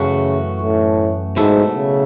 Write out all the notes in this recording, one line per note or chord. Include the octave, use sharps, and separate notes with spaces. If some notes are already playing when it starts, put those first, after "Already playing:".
Already playing: F#2 C#3 E3 A3 C#4 F#4
A2
G#2 B2 F#3 A3 E4 A4
C#3